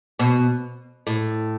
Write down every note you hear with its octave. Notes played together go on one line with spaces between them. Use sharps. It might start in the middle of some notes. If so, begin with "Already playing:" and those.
B2
A2